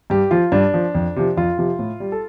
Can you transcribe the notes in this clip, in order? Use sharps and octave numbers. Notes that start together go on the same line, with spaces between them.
G2 G4
F3 F4
G2 D4
F3
F2
C3 F3
F2 F4
C3 F3
A2
G3
A4